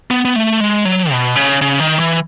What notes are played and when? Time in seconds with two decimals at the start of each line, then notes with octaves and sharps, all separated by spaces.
0.11 B3
0.25 B3
0.36 A3
0.60 G#3
0.85 F#3
1.11 B2
1.36 C#3
1.61 C#3
1.80 D#3
1.99 E3